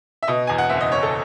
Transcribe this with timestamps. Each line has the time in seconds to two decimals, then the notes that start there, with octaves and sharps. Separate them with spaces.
0.23 E5
0.28 B2 D#5
0.47 E2 G#5
0.58 F#5
0.70 F#1 E5
0.81 D#5
0.92 F#1 C#5
1.03 A4